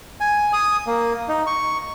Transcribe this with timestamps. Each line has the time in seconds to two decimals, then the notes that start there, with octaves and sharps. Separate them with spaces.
0.20 G#5
0.53 D#6
0.87 A#3
1.28 D#4
1.47 C#6